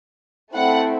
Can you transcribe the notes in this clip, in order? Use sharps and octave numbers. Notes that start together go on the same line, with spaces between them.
A3 C4 E4 F#5